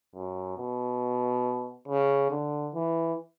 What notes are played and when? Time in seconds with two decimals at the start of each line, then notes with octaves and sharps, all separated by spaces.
0.15 F#2
0.59 B2
1.88 C#3
2.31 D3
2.75 E3